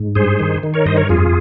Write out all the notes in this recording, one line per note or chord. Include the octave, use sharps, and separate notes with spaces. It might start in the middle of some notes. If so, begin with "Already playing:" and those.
Already playing: G#2
G2 G#4 C5
D#3
D#3
A#4 C#5
G2 C5 D#5
A#4 C#5
F2 F4 G#4